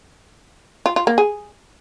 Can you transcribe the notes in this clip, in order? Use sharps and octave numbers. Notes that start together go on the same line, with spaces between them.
F4
F4
A#3
G#4